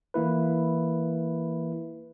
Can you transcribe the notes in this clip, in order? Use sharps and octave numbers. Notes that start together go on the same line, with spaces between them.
E3 A#3 E4 B4